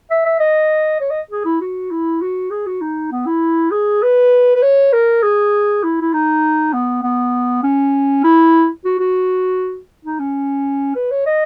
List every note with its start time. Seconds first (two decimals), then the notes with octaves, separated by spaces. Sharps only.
0.10 E5
0.25 E5
0.40 D#5
1.01 C#5
1.10 D#5
1.31 G#4
1.45 E4
1.61 F#4
1.91 E4
2.21 F#4
2.51 G#4
2.67 F#4
2.81 D#4
3.12 B3
3.26 E4
3.71 G#4
4.02 B4
4.55 B4
4.62 C#5
4.93 A#4
5.23 G#4
5.83 E4
6.01 E4
6.14 D#4
6.74 B3
7.03 B3
7.63 C#4
8.24 E4
8.85 F#4
9.00 F#4
10.05 D#4
10.20 C#4
10.95 B4
11.11 C#5
11.26 D#5